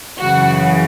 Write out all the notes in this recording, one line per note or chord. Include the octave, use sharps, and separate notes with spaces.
F#2 C#3 E3 F#4